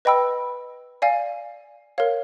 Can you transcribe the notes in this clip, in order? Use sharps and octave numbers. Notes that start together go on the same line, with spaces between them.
B4 D#5 G5 B5 E6
D5 F5 G#5
A#4 C#5 F5